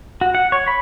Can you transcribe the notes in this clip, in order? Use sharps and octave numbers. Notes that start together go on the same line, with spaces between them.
F#4
F#5
C#5
B5